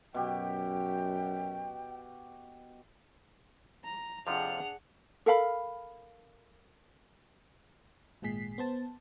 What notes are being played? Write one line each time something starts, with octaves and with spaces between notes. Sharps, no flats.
F#2 B2 G4 G5
A#5
F2 C3 F3 D4 G#4 F#5 F7
A4 A#4 F5 B5
G#1 A#2 G#3 G#4 B6 C7
B3 C5 A5